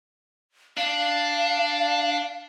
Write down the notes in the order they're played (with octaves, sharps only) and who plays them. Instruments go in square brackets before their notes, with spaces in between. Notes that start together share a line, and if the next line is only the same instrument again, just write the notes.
[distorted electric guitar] D4 [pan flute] F5